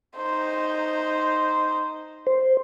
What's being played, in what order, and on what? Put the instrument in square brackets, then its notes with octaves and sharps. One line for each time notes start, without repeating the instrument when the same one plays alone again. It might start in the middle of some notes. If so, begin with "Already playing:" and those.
[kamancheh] D#4 C5
[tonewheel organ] C5